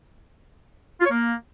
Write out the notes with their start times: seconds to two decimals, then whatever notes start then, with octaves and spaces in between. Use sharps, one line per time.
1.00 F4
1.05 C#5
1.10 A#3